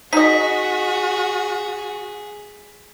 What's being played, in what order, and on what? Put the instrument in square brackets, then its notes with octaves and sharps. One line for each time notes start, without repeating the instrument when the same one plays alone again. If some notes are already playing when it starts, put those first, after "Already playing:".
[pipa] D#4 D#5 [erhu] F#4 [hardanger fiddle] G#4 [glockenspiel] B6